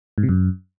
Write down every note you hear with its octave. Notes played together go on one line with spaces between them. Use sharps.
G#2
C3
F#2